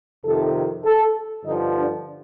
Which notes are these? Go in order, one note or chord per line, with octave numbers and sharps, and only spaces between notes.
F2 C3 D#3 A4
A4
G2 D3 F3 D#4
D4